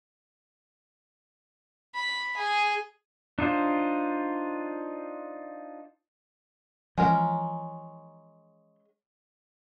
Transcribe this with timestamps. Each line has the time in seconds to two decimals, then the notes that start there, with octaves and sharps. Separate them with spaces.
1.95 B5
2.37 G#4
3.39 D4 D#4 F4 C5
6.98 E3 F3 G#3 C#4 A#4